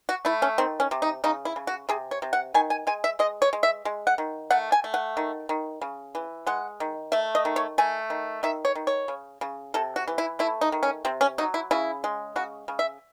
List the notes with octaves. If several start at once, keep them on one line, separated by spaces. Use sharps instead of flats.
F#4
A3 E4
C#4
D#3 C4
C#4
C3
D#4
C#3 D#4
E4
C#3
F#4
C3 G#4
C#5
C3
F#5
D#3 G#5
G#5
G#3 G#5
E5
G#3 D#5
C#5
G#3
E5
G#3
F#5
D#3
A3 F#5
G#5
A3
F#5
D#3
D#3
C#3
E3
G#3 F#5
D#3
A3 E5
D#5
D#3
C#5
A3 G#5
D#3
D#3 E5
C#5
D#3
C#5
C#3
C#3
C3 A4
F#4
E3
E4
A3 E4
D#4
D#3
C#4
C3 C4
C#4
F#3 D#4
E4
C#3 E4
G#3
C#3 F#4
C#3
E5